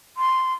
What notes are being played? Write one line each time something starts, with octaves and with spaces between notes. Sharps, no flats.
C6